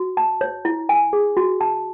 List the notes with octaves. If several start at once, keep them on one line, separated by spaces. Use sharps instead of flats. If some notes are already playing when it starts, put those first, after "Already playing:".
Already playing: F#4
A5
C#5
E4
G#5
G#4
F#4
A5